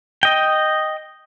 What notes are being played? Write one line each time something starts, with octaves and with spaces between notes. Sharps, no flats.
D#5 G5